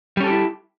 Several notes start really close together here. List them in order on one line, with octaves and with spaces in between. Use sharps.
G3 C#4 A4 G4 E4